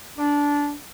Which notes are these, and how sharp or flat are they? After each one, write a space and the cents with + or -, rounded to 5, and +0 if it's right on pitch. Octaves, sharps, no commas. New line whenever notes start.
D4 -15